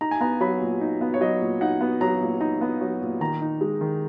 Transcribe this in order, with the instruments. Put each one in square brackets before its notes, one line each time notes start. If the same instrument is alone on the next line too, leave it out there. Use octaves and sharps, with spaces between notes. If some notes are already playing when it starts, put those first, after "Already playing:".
[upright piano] D#4 A#5
G#5
B3 A#5
F#3 B5
A#2
D#4
B3
C#5
F#3 D#5
A#2
D#4 F#5
B3
F#3 A#5
A#2
D#4 A#5
B3
F#3
A#2
D#3 A#5
D#4
G#3
D#3